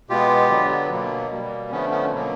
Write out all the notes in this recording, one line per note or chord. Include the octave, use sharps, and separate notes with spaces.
B2 G#3 B3 F4 G4
D3 F#3 B3
B2 F#3 A#3
B2 G3 A#3
D3 F3 A3 B3 C#4
B3 C#4
B2 F#3 A#3